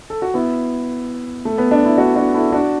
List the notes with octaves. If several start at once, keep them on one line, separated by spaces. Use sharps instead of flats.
A4
F#4
B3 E4
A3
B3
D4
E4
D4 F#4
D4 F#4
E4 A4
D4 F#4